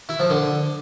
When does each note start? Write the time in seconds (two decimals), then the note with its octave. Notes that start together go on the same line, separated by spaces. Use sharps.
0.09 E4
0.20 F3
0.30 D3